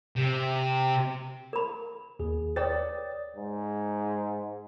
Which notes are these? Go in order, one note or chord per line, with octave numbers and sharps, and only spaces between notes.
C3
A#4 B5
D#2 G#4
B4 C#5 D5 G5 D#6 A6
G#2